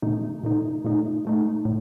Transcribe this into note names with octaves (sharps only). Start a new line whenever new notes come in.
A#2 A3 D#4
A#2 A3 D#4
A#2 A3 D#4
A#2 A3 D#4
A2